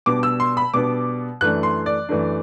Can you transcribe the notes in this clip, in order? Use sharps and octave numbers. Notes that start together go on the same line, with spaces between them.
B2 G3 B3 D4 D6
E6
C6
B5
B2 G3 B3 D4 D6
F#2 E3 A3 D4 F#6
C6
D5
F#2 E3 A3 D4